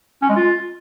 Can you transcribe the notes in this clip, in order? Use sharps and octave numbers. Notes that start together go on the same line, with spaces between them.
C#4
G#3
F4